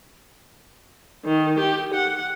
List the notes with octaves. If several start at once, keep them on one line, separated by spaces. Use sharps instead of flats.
D#3
G4
F#5